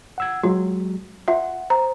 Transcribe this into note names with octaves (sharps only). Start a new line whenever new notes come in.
F#5 E6 G#6
F#3 G#3 F4
F4 E5 F#5
C5 A#5